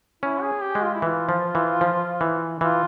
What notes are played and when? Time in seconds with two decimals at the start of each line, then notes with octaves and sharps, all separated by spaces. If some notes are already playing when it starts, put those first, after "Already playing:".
0.22 C#4 E4
0.42 G#4
0.62 G4
0.75 G#3
0.82 F4
0.94 E4
1.02 E3 F4
1.29 F3
1.55 E3
1.81 F3
2.21 E3
2.61 E3 F4